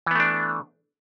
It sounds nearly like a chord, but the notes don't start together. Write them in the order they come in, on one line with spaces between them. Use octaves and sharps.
E3 B3 A3 D4